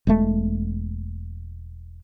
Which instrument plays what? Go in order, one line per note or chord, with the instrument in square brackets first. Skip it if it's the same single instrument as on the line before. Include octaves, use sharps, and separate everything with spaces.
[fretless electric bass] E1 G#3 A3